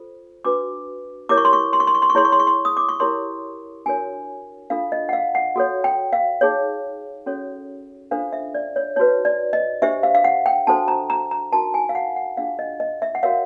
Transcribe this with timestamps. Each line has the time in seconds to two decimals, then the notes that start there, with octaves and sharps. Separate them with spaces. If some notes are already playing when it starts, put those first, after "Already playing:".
Already playing: F4 A4 C5
0.45 D4 F#4 B4 D6
1.29 E4 G4 A#4 C#5 D6
1.38 C#6
1.45 C6
1.53 C#6
1.73 C6
1.80 C#6
1.87 C6
1.95 C#6
2.02 C6
2.10 C#6
2.15 E4 G#4 C#5 C6
2.25 C#6
2.32 C6
2.40 C#6
2.47 C6
2.65 D#6
2.77 D6
2.89 C#6
3.00 E4 G4 A#4 C#5 C6
3.86 D4 F#4 A#4 C#5 G#5
4.70 D4 F4 A4 F5
4.92 D#5
5.09 F#5
5.13 F5
5.35 F#5
5.56 F#4 A4 C#5
5.84 G5
6.13 F5
6.41 D#4 G#4 C#5
7.26 C#4 F#4 A4 C#5
8.11 D4 F4 A4 C5 F5
8.33 E5
8.55 D5
8.76 C#5
8.96 D#4 F#4 B4 C#5
9.25 D5
9.53 D#5
9.82 D4 G4 C5 E5
10.03 F5
10.15 F5
10.24 F#5
10.46 G5
10.67 D4 F#4 A4 C5 A5
10.88 A#5
11.10 A#5
11.31 A#5
11.52 D#4 F#4 A#4 A5
11.74 G#5
11.89 F5
11.95 F#5
12.16 F#5
12.37 D4 F4 G#4 F5
12.59 D#5
12.80 D#5
13.02 E5
13.15 F#5
13.23 F#4 A#4 C#5 F5